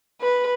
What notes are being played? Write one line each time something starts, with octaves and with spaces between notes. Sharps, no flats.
B4